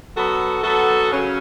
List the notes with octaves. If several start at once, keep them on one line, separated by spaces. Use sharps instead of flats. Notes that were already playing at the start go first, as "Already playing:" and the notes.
F#3 B3 F#4 A4
F#3 B3 F#4 A4
C#3 F#3 C#4